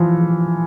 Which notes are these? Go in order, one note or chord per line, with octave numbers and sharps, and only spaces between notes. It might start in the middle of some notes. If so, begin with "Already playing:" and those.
Already playing: E3 F3